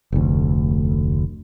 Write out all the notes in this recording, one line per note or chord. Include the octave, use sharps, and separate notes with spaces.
F1 D2